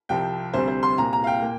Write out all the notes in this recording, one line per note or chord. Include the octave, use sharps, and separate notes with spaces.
C2 C3 F3 C4 G5
D2 C3 G3 C4 C5
C5
C6
C2 A#2 A#3 A#5
A#5
F5
G5
A#2 A#3